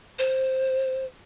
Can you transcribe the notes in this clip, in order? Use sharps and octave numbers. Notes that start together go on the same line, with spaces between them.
C5